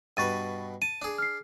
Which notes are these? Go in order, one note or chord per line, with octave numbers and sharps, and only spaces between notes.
G2 B2 B4 C#6 A6 D#7
A5 D#7
D4 G#4
F6 C7